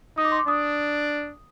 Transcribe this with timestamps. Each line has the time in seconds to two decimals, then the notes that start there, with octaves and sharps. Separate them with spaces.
0.17 D#4 D#6
0.25 D6
0.32 C6
0.39 D6
0.48 D4 D#6